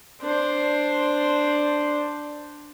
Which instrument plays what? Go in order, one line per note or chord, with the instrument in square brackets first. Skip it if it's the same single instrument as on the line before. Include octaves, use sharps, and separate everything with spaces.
[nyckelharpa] D4 C5